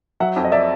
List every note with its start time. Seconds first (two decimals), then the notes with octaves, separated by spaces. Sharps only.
0.20 F#3 E5 F#5
0.36 F2
0.45 D#5
0.52 D5 E5